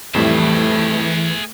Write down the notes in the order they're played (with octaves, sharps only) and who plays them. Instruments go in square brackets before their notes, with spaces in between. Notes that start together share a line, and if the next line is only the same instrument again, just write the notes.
[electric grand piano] F2 A2 G3 [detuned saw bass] E3 [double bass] A3 [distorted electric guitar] G#4 E5